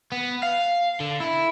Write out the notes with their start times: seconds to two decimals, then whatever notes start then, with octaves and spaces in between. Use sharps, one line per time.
0.12 B3
0.43 F5
1.00 D3
1.20 E4